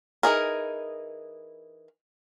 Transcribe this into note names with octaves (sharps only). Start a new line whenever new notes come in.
E3 D#4 G#4 A#4